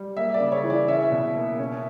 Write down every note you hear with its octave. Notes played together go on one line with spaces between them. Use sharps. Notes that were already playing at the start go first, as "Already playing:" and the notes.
Already playing: G3
A#3 E5
D5
C#3
C#5
E3
D5
C#4 E5
B2
A#3
C#4